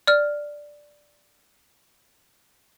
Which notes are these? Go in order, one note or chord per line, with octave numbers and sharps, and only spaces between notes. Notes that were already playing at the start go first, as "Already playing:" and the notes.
D5 F6